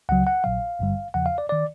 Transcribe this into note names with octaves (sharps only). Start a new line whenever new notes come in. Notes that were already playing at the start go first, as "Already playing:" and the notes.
C#2 C#3 F#3 F#5
F#5
A#1 A#2 F#3 F5
G#1 G2 D3 G3
E2 C#3 F3 F#5
F5
D5
D#3 D5